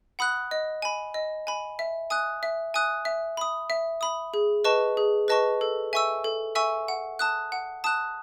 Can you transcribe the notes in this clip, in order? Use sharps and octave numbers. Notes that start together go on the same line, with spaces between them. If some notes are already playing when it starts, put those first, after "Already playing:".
F#5 B5 D#6 F#6
D#5
G#5 B5
D#5
G#5 B5
E5
G#5 D#6 F#6
E5
G#5 D#6 F#6
E5
B5 D#6
E5
B5 D#6
G#4
B4 D#5 A5 C#6
G#4
B4 D#5 A5 C#6
A4
E5 G#5 C#6 E6
A4
E5 G#5 C#6 E6
F#5
A5 D#6 F#6
F#5
A5 D#6 F#6